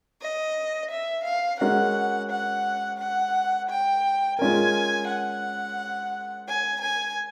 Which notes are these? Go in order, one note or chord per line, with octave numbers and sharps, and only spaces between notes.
D#5
E5
F5
G#3 C#4 F#4 A#4 F#5
F#5
F#5
G5
G#3 C#4 F4 A#4 G#5
F#5
G#5
G#5